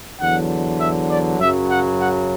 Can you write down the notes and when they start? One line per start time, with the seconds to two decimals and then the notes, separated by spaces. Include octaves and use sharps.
0.19 E2 D3 F#3 F#5
0.79 E5
1.09 D5
1.39 F#2 C#3 F#3 E5
1.70 F#5
2.00 F#5